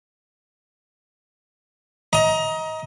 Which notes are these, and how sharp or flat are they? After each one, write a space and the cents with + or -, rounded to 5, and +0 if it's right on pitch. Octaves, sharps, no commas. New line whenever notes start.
D#5 +25 A#5 +20